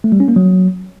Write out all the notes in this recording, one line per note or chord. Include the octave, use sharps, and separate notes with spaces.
A3
G3
C#4
A#3
F#3